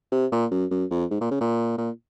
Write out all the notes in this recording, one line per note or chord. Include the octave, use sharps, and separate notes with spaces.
C3
A#2
F#2
F#2
F2
G#2
A#2
C#3
A#2
A#2